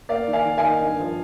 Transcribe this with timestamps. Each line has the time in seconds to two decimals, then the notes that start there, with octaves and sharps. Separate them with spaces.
0.09 A#3 D5 F5
0.28 D#3
0.33 F5 G#5
0.45 D#3
0.58 F5 G#5
0.64 D#4
0.82 G2
1.00 F3